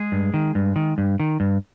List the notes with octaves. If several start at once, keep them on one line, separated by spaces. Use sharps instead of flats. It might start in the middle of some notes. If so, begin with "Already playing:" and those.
Already playing: G#3 G#4
G2
D#3
G2
D#3
G2
D#3
G2